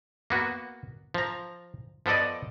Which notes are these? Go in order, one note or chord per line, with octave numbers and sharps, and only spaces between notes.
A#3 B3 F#4
F3 A#5
F3 B3 A4 D5 D#5